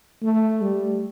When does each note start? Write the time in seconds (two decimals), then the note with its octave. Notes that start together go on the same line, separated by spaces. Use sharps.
0.22 A3
0.61 G3